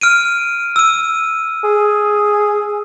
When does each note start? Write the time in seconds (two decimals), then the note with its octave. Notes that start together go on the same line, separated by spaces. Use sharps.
0.01 F6 D7 D#7
0.76 E6 D#7
1.64 G#4